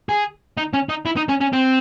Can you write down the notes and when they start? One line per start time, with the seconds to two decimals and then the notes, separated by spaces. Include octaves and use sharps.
0.09 G#4
0.57 D#4
0.74 C#4
0.89 D#4
1.06 E4
1.17 D#4
1.29 C#4
1.41 C#4
1.53 C4